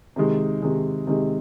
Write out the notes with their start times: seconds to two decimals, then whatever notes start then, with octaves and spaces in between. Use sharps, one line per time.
0.16 C3 D#3 G#3
0.62 C3 D#3 G#3
1.07 C3 D#3 G#3